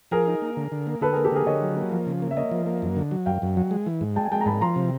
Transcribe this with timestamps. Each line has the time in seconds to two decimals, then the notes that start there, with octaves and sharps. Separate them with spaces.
0.11 F3 G#4 A#4
0.27 D#4
0.42 A#3
0.57 D3
0.72 D3
0.87 A#3
1.01 D3 A4 B4
1.13 A#3 G#4 A#4
1.24 G4 A4
1.32 D3 G#4 A#4
1.46 D3 C#5 D#5
1.62 F#3
1.77 A#3
1.92 F3
2.07 C#3
2.22 A#3
2.31 E5
2.36 A#3 C#5 D#5
2.51 F3
2.66 A#3
2.82 F#2
2.97 D3
3.11 F#3
3.26 F#2 F5 G5
3.42 F#2
3.57 F#3
3.71 G#3
3.86 E3
4.01 G#2
4.16 G#3 G5 A5
4.25 G#5
4.32 G#3 G5 A5
4.41 A#5
4.46 G#2 A5 B5
4.61 F3 A#5 C6
4.76 C3